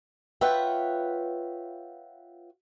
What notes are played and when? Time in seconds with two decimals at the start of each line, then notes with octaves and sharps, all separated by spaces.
0.41 F4 B4 C#5 E5 F#5 G5